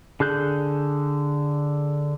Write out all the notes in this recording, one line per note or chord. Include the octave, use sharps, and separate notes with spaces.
D3 G#4 F#6 G6